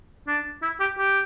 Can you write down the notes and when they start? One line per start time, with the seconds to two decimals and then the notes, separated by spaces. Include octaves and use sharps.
0.27 D4
0.62 E4
0.80 G4
0.98 G4